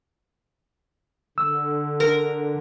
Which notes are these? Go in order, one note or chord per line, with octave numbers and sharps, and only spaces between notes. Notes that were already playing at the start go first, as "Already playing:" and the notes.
D3 E6
A#4